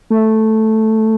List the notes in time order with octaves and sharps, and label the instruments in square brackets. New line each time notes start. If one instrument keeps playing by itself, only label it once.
[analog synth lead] A3